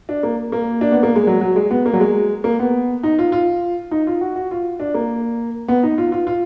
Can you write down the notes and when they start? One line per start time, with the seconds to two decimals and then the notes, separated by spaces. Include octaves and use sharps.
0.09 D4
0.23 A#3
0.52 A#3
0.81 D4
0.92 B3
1.03 A#3
1.16 G#3
1.27 F#3
1.41 F#3
1.56 G#3
1.71 B3
1.86 A#3
1.93 F#3
2.00 G#3
2.44 A#3
2.59 B3
3.03 D#4
3.19 F4
3.32 F4
3.91 D#4
4.07 F4
4.21 F#4
4.36 F#4
4.51 F4
4.80 D4
4.94 A#3
5.68 B3
5.83 D#4
5.98 F4
6.12 F4
6.27 F4